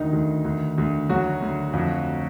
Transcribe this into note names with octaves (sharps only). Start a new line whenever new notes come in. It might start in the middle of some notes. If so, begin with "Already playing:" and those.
Already playing: D2 D#3 D#4
D2
D2
D2
D2 F#3 F#4
D2
F2